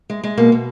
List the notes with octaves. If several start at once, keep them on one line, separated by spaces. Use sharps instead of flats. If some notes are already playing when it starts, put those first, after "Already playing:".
G#3
G#3
B2 A#3
B2